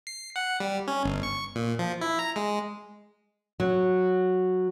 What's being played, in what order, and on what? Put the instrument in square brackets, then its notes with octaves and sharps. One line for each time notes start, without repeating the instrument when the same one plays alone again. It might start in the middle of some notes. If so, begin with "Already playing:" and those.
[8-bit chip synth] C7
F#5
G3
C#4
G1
C#6
A#2
F3
E4
A#5
G#3
[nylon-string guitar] F#3